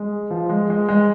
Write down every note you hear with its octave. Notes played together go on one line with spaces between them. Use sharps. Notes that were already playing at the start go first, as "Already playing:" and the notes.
Already playing: G#3
F3
G#3
G#3
G#3